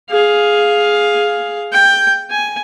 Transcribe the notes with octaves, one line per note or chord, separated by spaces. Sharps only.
G#4 F5
G5
G#5